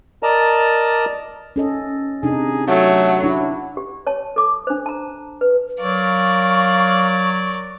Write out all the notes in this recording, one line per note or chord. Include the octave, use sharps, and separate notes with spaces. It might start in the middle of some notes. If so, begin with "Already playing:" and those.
A#4 D5 D#5 A5 A#5
C#4 A4 D#5
C3 D4 D#4 G#4
F#3 A3
D4 E4 F#4
G4
C#5 A5
A4 D6
D4 C5
A5 A#5
B4
F#3 A#4 D5 F5 C#6